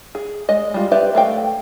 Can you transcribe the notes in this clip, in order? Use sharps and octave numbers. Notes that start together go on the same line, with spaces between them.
G#4
G#3 D#5
G3 F4
G4 B4 C5 D5 E5
A3 F5 G5